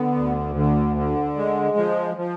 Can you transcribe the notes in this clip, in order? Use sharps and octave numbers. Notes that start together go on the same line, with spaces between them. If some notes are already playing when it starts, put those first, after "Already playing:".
Already playing: D3 B3
D2
D3
D3
G#3
F3
F3